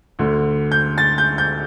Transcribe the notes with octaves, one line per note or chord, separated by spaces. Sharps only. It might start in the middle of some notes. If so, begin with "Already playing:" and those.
D2 D3
G6
A6
G6
G6